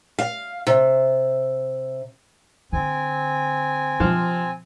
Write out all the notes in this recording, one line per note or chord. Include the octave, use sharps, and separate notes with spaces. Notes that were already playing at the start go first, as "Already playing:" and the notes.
F5
C3
D3 C4 G#5
C3 F3